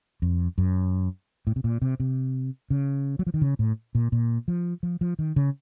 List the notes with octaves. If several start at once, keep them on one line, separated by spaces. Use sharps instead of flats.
F2
F#2
A2
C3
A#2
C3
C3
C#3
F#3
F3
D#3
C#3
A2
A#2
A#2
F3
F3
F3
D#3
C#3